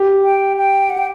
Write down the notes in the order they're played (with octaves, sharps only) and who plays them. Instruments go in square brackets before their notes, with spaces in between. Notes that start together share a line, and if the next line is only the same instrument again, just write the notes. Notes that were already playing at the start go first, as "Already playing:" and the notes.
Already playing: [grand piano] G4
[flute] G5
G5
F#5
G5